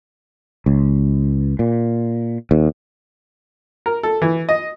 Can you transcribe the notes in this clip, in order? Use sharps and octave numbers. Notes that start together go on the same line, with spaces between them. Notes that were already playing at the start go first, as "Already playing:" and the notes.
C#2
A#2
D#2
A#4
A4
E3
D#5